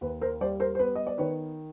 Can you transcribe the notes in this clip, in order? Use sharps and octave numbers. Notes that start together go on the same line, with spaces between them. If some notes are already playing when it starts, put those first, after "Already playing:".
D#2 B4
A#4 C5
G3 C5 D5
A#4 C5
C5
B3 B4
D#5
D5
D#3 B4 C#5